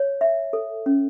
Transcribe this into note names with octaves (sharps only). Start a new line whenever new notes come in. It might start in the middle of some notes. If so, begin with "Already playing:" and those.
Already playing: C#5
E5
A4
C#4